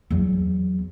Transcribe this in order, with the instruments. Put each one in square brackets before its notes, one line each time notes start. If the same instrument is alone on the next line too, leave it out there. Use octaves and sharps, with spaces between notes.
[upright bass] E2 F#3